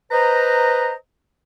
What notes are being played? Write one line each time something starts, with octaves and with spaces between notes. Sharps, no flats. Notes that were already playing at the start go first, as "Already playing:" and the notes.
B4 C5 D#5 A#5